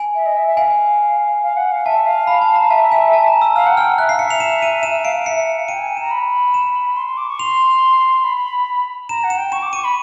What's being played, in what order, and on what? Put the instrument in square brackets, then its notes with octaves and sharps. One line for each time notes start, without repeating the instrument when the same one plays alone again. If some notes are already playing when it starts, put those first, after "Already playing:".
Already playing: [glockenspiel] G#5
[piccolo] E5
D#5
E5
E5
[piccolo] F5 [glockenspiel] G#5
[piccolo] F5
F#5
F5
[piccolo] E5 [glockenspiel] A5
[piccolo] F5
[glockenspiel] B5
A5
A#5
[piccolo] E5 [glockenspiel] A5
[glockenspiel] G#5
A5
A#5
E6
[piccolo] F5 [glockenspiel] F6
[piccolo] F#5
[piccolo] G5 [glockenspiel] F6
[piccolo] F#5
[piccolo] E5 [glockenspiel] F#6
[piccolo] F5 [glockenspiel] C7
[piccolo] E5 [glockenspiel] C#7
[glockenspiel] F7
E7
D#7
[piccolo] E5 [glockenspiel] E7
[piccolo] E5
[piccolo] F5 [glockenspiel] D7
[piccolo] F5
[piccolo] E5 [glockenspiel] C#7
[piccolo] E5
E5
F5
[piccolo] G5 [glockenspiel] D#7
[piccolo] G#5
G5
[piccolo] A#5 [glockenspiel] E7
[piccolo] B5
[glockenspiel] E7
[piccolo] C6
C6
D6
C#6
[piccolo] C6 [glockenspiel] F7
[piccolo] B5
[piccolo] A#5 [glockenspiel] E7
[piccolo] F#5
[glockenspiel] E7
[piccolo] G5
[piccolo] C#6 [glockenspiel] E7
[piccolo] D6
[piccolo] C#6 [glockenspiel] D#7
[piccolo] B5